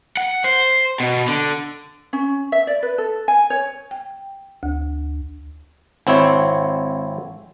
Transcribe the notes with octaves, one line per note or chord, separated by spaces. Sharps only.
F#5
C5
B2
D3
C#4
E5
D5
B4
A4
G#5
C#5
G5
D2
G#1 C4 E4 C#5